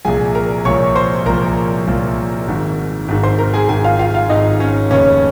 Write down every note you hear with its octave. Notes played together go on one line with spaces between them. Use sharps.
C2 A#2 F3 G#4 G#5
A#4 A#5
C2 A#2 F3 C#5 C#6
C5 C6
C2 A#2 F3 A#4 A#5
C2 A#2 F3
G#1 G#2 D#3
G#1 G#2 D#3
C5 C6
A#4 A#5
G#4 G#5
G#1 G#2 D#3 G#4 G#5
F4 F5
F4 F5
F4 F5
G#1 G#2 D#3 D#4 D#5
C#4 C#5
F1 D#2 C#3 C#4 C#5